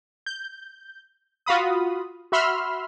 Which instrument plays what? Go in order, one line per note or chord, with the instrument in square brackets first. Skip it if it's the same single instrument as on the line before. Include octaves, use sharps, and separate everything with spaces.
[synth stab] G6
F4 F#4 F5 B5 D#6
F#4 E5 B5 C6 E6 F6